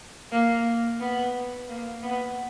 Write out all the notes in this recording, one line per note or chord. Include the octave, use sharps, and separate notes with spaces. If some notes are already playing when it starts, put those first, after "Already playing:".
A#3
B3
A#3
B3